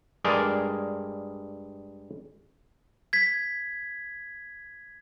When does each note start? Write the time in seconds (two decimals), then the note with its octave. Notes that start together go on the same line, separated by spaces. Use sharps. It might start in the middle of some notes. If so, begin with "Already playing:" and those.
0.24 G2 G#3 G#4 A#4 D5 A#5
3.13 G#6 B6